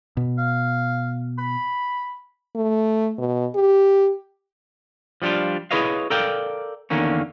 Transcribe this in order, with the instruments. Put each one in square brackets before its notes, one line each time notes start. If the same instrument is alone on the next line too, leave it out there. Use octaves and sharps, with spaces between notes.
[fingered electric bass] B2
[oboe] F5
B5
[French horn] A3
B2
G4
[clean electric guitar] F3 G3 C#4 D4 F4
E4 G#4 B4 C#5 D#5 F5
A4 A#4 D5 F5 G5
E2 D3 D#3 A#3 C#4